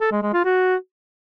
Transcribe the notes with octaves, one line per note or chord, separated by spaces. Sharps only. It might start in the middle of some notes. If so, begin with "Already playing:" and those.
A4
G#3
G#3
F4
F#4